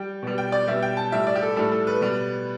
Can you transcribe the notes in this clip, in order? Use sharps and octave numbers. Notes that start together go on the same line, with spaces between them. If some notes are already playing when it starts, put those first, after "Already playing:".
Already playing: G3 G5
B2 G3
G5
D5
B2 G3 E5
G5
A5
A2 G3 E5
D5
G4
A4
A2 G3 A4
A4
B4
B2 G3